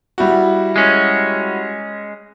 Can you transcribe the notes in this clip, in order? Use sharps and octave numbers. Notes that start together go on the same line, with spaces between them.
G3 E4 F#4
G#3 C#4